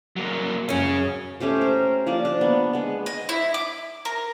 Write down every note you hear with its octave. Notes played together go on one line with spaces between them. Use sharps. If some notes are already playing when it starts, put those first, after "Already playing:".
F#3 A#3
F#2 C#4 G#4 C#5
A3 C#4 G4 C5
A#4
F3 A#3 D4 D5
D4
B3
G#3 B3
D#5
E4
D6
A#4